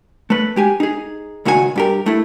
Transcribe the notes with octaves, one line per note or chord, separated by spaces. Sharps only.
A3 B4
G#3 G4 G#5
D#4 G#4
C#2 A#2 D#3 F#4 A4 G#5
G2 G4 A#4
A3 E4